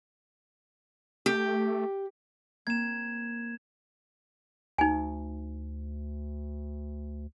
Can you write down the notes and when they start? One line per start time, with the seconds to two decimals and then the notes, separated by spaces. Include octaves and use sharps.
1.26 A3 G4
2.67 A#3 C4 G#6 E7
4.78 D2 D#4 G#5